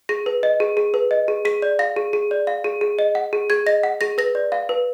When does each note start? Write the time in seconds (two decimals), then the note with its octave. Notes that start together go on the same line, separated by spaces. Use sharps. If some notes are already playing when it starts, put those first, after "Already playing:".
0.09 G#4 A#6
0.26 B4
0.43 D#5
0.60 G#4
0.77 G#4
0.94 B4
1.11 D#5
1.28 G#4
1.45 G#4 B6
1.62 D5
1.79 F5 A#6
1.96 G#4
2.13 G#4
2.31 D5
2.47 F5
2.64 G#4
2.81 G#4
2.99 D#5
3.15 F#5
3.33 G#4
3.50 G#4 G#6
3.66 D#5 A#6
3.83 F#5
4.01 G#4 A#6
4.18 B4 A#6
4.35 D5
4.52 F5
4.69 B4